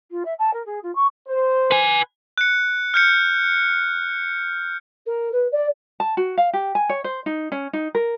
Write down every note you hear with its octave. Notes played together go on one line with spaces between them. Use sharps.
F4
E5
A5
A#4
G#4
F4
C#6
C5
B4 G#5
F#6 C#7
F6 G6 C#7
A#4
B4
D5
A5
F#4
F5
G4
G#5
C#5
C5
D#4
C#4
D#4
A#4